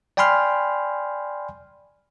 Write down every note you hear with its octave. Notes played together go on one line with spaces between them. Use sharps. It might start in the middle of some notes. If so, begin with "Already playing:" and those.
D5 G5 G#5 B5 C6 F6